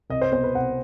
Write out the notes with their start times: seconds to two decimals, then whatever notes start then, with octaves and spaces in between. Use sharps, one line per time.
0.10 C2 D#5
0.21 C5
0.32 B2 C5
0.44 B4
0.55 C2 F#5